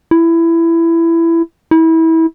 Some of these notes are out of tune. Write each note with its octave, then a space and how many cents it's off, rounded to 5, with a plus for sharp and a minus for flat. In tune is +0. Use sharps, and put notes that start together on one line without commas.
E4 +15
E4 -25